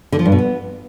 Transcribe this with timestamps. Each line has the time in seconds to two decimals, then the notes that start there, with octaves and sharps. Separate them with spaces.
0.12 D3
0.19 F3
0.26 G2
0.32 B2
0.39 B3